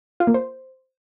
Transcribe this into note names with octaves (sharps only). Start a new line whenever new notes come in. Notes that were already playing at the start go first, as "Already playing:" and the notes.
F4
A#3
C5